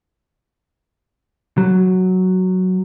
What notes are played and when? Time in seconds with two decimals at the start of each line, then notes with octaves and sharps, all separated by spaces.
1.58 F#3